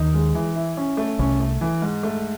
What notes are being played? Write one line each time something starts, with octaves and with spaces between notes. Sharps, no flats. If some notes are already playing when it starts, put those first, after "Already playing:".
Already playing: D#2 D#3 D#4
G#3
E3
E4
C#4
A3
C2 C3 C#4
A3
E3
G#2
A3